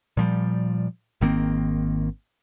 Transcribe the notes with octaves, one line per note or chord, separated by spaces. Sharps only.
A#2 F3 G3
G#1 D#3 A#3 C4